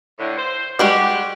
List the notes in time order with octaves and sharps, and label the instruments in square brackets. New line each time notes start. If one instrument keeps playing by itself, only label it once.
[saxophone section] A2 D3
C5
[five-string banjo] G3 G#3 F#4 [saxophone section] G4